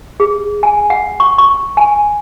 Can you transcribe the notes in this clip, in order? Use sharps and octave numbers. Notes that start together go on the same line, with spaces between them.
G#4
G#5
F#5
C#6
C#6
G#5